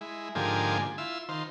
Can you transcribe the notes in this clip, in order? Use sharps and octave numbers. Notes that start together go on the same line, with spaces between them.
G#3 E4
G#2 D3 F3 A#3 G4 G#5
E4 F4 E6
D#3 F4 C5